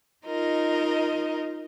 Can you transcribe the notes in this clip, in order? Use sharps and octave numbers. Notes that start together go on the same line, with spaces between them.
D#4 F4 A#4 D#5